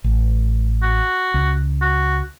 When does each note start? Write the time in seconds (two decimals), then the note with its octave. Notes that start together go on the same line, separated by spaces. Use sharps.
0.04 A1
0.83 F#4
1.34 C#2
1.82 F#4